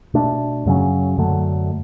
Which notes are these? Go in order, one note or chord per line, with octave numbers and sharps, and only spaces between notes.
B2 A3 D4
F#2 C#3 F#3 C#4
F#2 D3 F#3 A3